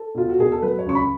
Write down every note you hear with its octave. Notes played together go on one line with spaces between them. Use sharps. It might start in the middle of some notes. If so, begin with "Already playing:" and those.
Already playing: A4
B2 F4
F#4
B2 G#4
A4
F#3 B4
C#5
C#2 C#6
B5